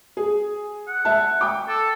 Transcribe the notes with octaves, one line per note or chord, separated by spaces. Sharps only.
G#4
F#5
E5 A5
G5 D6
A4